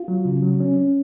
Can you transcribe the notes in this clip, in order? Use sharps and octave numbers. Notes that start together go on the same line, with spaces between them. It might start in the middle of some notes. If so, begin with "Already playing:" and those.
Already playing: F4
F#3
C#3
F#3
C#4
C#4